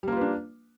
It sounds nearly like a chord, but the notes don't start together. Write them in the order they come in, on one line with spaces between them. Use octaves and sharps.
G3 A#3 F4 B4 D4